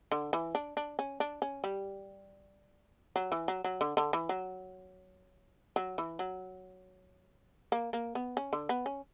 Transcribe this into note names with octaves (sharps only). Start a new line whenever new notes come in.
D3
E3
D4
D4
C#4
D4
C#4
G3
F#3
E3
F#3
F#3
D3
D3
E3
F#3
F#3
E3
F#3
A#3
A#3
B3
C#4
D3
B3
C#4